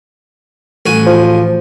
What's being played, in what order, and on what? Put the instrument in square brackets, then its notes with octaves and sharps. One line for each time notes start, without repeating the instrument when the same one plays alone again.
[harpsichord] A1 F#4 G#5
[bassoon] F3